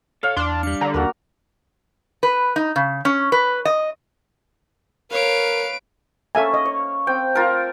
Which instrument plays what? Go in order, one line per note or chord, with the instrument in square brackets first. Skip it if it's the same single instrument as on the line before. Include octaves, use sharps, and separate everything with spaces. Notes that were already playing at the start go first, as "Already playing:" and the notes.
[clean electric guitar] A4 C#5 [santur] F5
[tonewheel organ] E2 [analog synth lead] D4 [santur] D5 [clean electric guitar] C6
[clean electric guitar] G3 D4 [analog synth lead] C#7
[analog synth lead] D3 [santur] A#5
[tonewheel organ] D#2 [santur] A#3 F#4
[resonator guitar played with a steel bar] B4
D#4
C#3
C#4
B4
D#5
[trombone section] A#4 [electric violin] B4 D7 [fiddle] C#5 [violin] F5
[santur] A#3 C#4 [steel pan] A4 E5 G#5
[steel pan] D#5
[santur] C#5
[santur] C4 [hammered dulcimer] G5
[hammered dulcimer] F4 A#4 [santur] A5